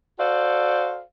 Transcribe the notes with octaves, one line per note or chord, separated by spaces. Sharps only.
F#4 A4 C5 D5 F5